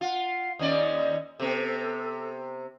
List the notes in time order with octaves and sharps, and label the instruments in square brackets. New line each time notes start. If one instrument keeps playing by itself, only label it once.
[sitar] F4 [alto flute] F#5
[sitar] D#2 C#4 D5 [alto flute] D#5
[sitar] C3 B3 [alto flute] A4